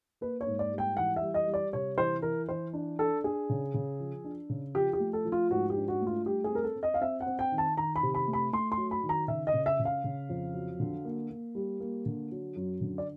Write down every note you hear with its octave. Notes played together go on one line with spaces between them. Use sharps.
A#3 B4
C#5
G#2
D5
G3
G5
E3 F#5
E5
G3
D#5
G3
D5
C3 C#5
E3 C5
E3 A#4
E3 C5
D4
D4 A4
D4 G#4
C#3
C#3
F3
D4
C#3
F3 G4
G4
A3
A4
F3
F4
G#2 F#4
G4
D4
F#4
A3
F4
G3 G4
G#4
C4 A#4
A4
C4
D#5
F5
C4 E5
F#5
C4
G5
D#3
A5
D#3 A#5
B5
C3
B5
A3
B5
A3 C6
C6
F#3
B5
D#3
A#5
C#3 E5
D#5
C#3
E5
C#3
F5
C#3
F2
F#3
D3
A#3
A#3
G3
A#3
D3
F#3
F#2
D3
D5